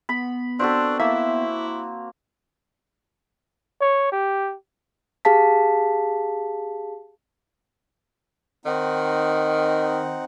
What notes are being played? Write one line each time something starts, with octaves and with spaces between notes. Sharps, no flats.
B3 B5
C4 D4 F#4 A4
A#3 E4 E5
C#5
G4
G4 G#4 F5 A5 B6
D#3 C4 D#4 F#5